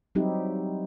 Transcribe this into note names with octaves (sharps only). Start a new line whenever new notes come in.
F#3 G3 C4 D#4 E4 G4